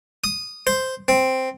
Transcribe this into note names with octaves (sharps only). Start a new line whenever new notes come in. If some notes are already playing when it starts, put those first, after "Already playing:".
D#6
C5
C4